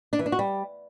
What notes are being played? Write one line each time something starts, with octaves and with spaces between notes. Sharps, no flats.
D4
E3
D4
F#4
G3